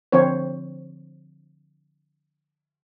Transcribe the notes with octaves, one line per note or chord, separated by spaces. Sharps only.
D3 F3 C4 C5 C#5